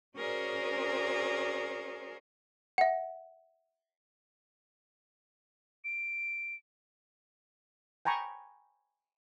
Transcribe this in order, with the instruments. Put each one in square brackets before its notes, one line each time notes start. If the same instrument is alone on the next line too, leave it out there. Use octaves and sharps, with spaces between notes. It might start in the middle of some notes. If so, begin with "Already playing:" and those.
[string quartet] C#4 F#4 G#4 A#4 C5 D5
[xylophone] E5 F#5
[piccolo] D7
[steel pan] G5 G#5 A#5 B5 C#6